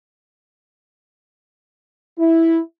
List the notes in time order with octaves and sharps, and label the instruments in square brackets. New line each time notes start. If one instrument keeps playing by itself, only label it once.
[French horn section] E4